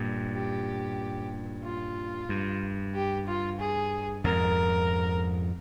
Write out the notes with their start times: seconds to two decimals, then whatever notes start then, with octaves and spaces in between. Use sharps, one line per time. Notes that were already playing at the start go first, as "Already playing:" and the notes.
Already playing: G2 A#2
0.33 G4
1.64 F4
2.29 G2
2.94 G4
3.26 F4
3.60 G#4
4.24 F2 G#2 A#4